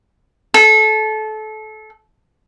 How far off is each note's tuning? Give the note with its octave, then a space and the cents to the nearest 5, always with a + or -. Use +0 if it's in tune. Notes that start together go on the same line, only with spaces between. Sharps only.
A4 -25